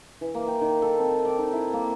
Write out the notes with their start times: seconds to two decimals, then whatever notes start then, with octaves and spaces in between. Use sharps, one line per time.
0.21 E3
0.35 A#3
0.47 G5
0.61 D#3
0.82 A4
0.99 C4
1.25 D6
1.38 D#4
1.53 E4
1.73 A#3